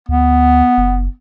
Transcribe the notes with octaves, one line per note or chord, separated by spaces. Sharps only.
D2 B3
F#1